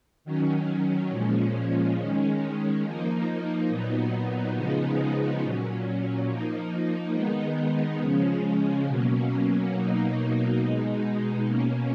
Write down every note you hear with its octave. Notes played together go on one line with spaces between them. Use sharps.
D#3 F#3 C#4
A#2 F3 G#3 C#4
D#3 G#3 C#4
F3 A#3 D#4
A#2 F#3 B3 D#4
C#3 F3 G#3 B3 D#4
A#2 F#3 C#4
F3 A#3 D#4
D#3 G#3 B3 D#4
C#3 F3 G#3 C#4
B2 F#3 A#3 C#4
B2 F#3 A#3 D#4
B2 G#3 D#4
B2 A#3 C#4